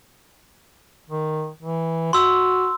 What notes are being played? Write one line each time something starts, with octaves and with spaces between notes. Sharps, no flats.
D#3
E3
F#4 C6 E6